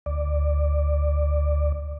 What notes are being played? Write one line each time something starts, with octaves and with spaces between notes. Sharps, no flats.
D2 D5